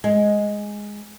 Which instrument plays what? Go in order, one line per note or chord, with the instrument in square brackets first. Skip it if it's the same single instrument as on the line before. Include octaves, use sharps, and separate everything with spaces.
[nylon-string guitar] G#3